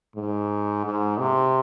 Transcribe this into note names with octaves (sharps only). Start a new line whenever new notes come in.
G#2
G#2
C3